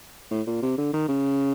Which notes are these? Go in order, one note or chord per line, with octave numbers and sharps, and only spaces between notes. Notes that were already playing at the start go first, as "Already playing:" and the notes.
A2
A#2
C3
D3
D#3
C#3